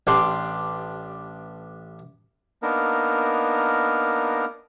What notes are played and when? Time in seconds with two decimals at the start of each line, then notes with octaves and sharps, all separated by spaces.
0.07 A1 D4 G4 C6
2.63 A#3 B3 D4 D#4 A#4